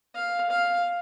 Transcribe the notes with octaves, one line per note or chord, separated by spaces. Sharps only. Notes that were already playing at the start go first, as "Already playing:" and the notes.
F5
F5